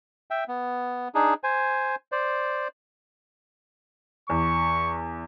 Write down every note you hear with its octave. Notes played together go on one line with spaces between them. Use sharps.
E5 G5
B3
D4 D#4 G#4
C5 G#5
C5 D5
E2 C#6